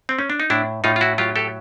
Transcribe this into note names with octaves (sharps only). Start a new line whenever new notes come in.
C4
C#4
D4
D#4
A2 D4 E4
A2 D#4 F4
F4
E4 F#4
F#3 F4 G4
G4 A4